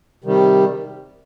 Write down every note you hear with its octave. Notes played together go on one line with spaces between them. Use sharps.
C3 D#3 G3